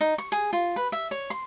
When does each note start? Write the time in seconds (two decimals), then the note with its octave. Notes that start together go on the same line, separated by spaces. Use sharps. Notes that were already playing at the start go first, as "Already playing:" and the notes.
0.01 D#4
0.18 C#6
0.32 G#4
0.53 F4
0.76 B4
0.92 E5
1.11 C#5
1.30 C6